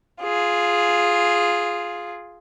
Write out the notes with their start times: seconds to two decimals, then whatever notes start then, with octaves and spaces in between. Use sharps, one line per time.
0.22 F4 G#4